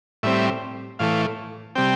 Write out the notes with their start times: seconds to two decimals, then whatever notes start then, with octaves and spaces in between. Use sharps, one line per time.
0.23 A2 G3 C4 E5
0.99 A2 E3 A3 F5
1.76 C3 G3 C4 G5